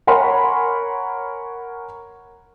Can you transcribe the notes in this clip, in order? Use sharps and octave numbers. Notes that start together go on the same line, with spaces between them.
A#4 C#5 F#5 G#5 B5 C6